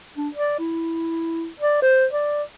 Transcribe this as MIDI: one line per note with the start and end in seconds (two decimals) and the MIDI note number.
0.16 0.29 62
0.35 0.58 74
0.59 1.47 64
1.60 1.77 74
1.82 2.05 72
2.13 2.43 74